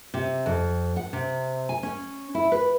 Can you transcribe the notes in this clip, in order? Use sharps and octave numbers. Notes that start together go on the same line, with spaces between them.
C3
F2
F#5
C3
G#5
C#4
E4
B4